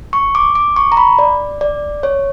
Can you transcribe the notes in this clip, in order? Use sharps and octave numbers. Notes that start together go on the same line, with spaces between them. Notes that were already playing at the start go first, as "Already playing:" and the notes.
C#6
D6
D6
C#6
A#5
B5
D5
D5
C#5